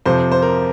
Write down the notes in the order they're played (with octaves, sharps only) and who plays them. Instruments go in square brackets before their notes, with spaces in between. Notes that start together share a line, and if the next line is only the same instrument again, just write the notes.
[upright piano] F2 C3 F3 [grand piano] C5
[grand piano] C5
A#4